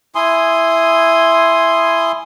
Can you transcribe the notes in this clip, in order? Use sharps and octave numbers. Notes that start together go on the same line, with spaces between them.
E4 G#5 C6 D#6